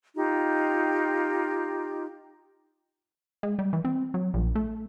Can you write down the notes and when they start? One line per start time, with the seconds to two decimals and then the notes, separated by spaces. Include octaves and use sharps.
0.15 D#4 F4 G4
3.43 G#3
3.59 G3
3.73 E3
3.85 C4
4.14 F#3
4.34 A#1
4.55 A3